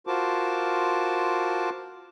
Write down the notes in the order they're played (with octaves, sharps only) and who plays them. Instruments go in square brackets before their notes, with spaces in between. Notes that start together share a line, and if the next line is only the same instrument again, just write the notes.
[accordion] F4 F#4 A#4 C5 A5 D6